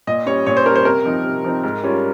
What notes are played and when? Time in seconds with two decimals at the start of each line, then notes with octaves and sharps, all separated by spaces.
0.07 A#2 D#5
0.26 G3 C#4 C#5
0.46 A#2 C#5
0.57 C5
0.66 G3 C#4 A#4
0.76 C5
0.85 C3 A#4
1.05 F3 C4 D#4
1.25 C3
1.44 F3 C4 D#4
1.63 G#2
1.83 G3 C#4 F4